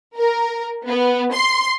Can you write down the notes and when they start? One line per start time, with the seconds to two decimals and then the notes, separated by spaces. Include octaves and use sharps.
0.15 A#4
0.87 B3
1.34 C6